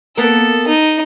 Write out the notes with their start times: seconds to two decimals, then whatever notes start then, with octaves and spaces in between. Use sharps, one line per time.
0.17 A#3 B3 A4 A#4
0.68 D#4